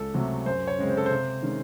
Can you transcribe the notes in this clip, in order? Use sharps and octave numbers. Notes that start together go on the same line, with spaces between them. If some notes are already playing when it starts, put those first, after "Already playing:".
Already playing: C#2 A4
C3 F#3 A3
F#2 C5
C#5
C#3 G#3 C4
C5
A4
C3 C5
D#3 G#3 C#4